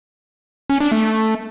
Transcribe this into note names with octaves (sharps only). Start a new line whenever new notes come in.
C#4
D4
A3